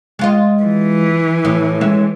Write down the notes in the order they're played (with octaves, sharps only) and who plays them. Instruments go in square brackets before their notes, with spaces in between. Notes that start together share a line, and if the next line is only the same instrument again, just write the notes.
[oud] G#3 F4 D#5
[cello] E3
[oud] A2
G#3 C#4 E5